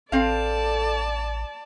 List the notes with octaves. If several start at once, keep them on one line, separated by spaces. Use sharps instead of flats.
A1 C4 A4 D5 F5 A5